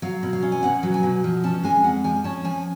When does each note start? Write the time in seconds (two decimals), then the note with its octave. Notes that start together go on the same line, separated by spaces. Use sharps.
0.02 F#3 F5
0.23 B2
0.33 F5
0.42 C#4
0.52 G#5
0.63 B2 F#5
0.83 F#3
0.94 G#5
1.03 B2
1.24 F3
1.44 C#4 A5
1.63 G#3 G#5
1.84 F2 F#5
2.04 F3 G#5
2.24 C#4 A5
2.45 F3 G#5